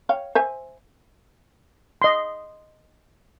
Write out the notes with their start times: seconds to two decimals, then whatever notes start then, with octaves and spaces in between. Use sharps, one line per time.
0.09 C#5 F5 G5
0.35 C5 E5 G#5
2.02 D#5 C6